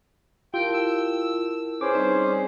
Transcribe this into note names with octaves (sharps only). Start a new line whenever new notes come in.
E4 F4 G4 A#4 G5 A5
E6
C#4 G#4 B4 C5 D6
G3 C4 D#4 D5